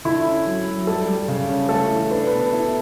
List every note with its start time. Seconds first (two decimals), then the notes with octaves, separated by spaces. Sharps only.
0.05 D3 E4
0.25 C#4
0.46 F#3
0.67 F#3
0.87 G3 A4
1.07 G3
1.28 C#3
1.49 C#4
1.69 A3 A4
1.90 E3
2.11 D4 B4
2.27 B2 B4
2.52 E4